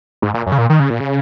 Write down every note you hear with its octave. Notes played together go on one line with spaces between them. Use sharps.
G#2
A#2
F#2
C#3
A#2
D#3
C#3
A#2
C#3